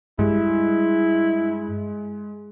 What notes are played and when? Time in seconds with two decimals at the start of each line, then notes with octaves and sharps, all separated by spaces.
0.19 G2 G3 G#3 E4